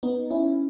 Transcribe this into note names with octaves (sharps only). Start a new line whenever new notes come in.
B3 D#4
C#4 E4